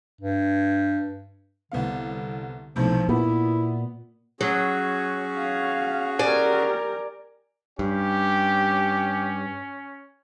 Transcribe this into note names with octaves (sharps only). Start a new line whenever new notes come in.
G2
C2 D3 B3 F5
B1 A2 C3 F3
A#2 B3 E4
F#3 C#4 F#4 G#4
F5
G4 A#4 D5 G#5
G2 C#4 G4